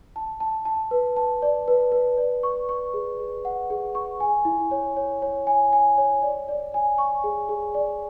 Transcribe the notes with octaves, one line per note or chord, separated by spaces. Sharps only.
A5
A5
A5
B4
A5
D5
B4
B4
D5
C#6
C#6
G#4
G#4
F#5
G#4
C#6
G#5
E4
C#5
C#5
C#5
G#5
G#5
C#5
D5
D5
G#5
C#6
G#4
G#4
D5